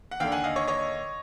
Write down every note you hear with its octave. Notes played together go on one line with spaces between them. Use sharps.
F#5
D#2 D3 F5 G5
F#5 G#5
D#5 F5
C#5 D#5
C#5 D#5